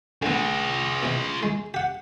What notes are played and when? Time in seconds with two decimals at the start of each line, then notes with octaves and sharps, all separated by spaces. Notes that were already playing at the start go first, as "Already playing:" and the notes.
0.22 D3 B3 F4 G#4
1.03 B2 E3
1.43 G#3
1.74 G4 F#5